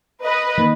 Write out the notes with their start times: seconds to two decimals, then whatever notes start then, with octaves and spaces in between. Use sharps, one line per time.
0.23 B4 D#5
0.58 D#3 A#3